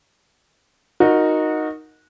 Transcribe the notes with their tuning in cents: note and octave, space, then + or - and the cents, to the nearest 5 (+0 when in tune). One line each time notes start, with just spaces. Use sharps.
D#4 +0 F#4 -20 A#4 +0